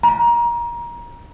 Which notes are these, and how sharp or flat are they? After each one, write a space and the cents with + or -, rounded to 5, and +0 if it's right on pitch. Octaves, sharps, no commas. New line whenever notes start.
A#5 +25